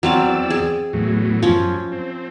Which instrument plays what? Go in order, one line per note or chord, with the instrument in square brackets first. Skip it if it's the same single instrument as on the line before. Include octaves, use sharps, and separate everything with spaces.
[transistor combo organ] E2 D5 E6 [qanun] F#3 C4 F5
[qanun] G#4
[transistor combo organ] E2 A2 F#3
[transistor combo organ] F#2 [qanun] F3 C#4
[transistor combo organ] C4